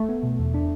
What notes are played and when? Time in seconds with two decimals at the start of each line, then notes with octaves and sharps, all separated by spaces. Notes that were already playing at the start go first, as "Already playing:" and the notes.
Already playing: A3
0.09 B3
0.23 B2
0.39 E2
0.54 D4